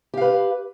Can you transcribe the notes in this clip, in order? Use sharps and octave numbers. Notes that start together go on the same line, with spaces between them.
G4 B4 F5